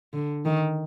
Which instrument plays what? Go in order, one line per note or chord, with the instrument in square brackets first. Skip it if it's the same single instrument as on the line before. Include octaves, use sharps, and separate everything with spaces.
[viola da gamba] D3
D#3